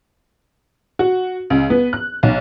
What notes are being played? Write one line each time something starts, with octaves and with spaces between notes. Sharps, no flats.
F#4
C#2
B3
F#6
B1